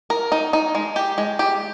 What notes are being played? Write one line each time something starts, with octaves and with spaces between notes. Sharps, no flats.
A#4
D#4
D#4
G#3
G4
G#3
G4